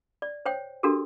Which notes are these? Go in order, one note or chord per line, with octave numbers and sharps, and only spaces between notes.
D5
C5 C#5 G5
D4 F#4 G4 A4 A#4